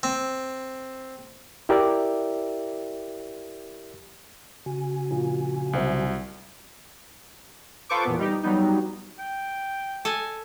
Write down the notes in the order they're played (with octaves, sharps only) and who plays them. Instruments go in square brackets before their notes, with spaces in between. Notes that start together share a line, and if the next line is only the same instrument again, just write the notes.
[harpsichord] C4
[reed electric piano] E4 G4 A#4 D5 E5
[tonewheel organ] C#3 F#4 G#5
[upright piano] A#1
[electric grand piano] C2 [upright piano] F#3 C5 E5
[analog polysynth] F4 A4 B4 C5 C#6 D6
E2 A#2 B3
G3 D#4 G4
F#3 G3 B3 D#4
[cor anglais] G5
[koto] A4 D#5 G#5